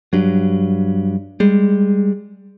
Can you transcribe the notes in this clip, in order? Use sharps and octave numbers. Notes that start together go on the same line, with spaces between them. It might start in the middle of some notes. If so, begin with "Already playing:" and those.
G2 F#3
G3 G#3